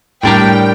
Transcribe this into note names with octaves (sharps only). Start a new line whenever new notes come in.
A2 G3 D4 G4 A#4 G5